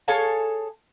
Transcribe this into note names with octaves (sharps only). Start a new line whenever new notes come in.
G#4 A4 C#5 F5 G#5 A5